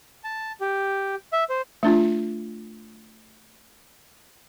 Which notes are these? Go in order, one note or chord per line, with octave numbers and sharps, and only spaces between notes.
A5
G4
E5
C5
A3 D4 F4